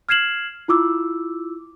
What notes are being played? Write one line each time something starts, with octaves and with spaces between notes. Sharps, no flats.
F6 G#6 C7 E7 F#7
E4 F4 D6 E6